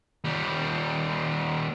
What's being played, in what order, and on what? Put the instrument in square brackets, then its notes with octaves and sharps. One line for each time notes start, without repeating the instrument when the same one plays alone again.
[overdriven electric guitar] D#2 G3